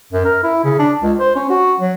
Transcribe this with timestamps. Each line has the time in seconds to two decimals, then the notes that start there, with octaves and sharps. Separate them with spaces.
0.13 F#2
0.25 A#4
0.43 E4
0.64 C#3
0.79 D4
1.03 C#2
1.19 C5
1.35 C#4
1.50 F#4
1.80 F#3